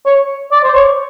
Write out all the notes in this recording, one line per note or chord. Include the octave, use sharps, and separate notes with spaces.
C#5
D5
C5
C#5